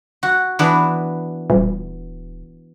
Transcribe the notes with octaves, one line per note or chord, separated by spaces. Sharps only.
F#4
E3 B3 D4
D#1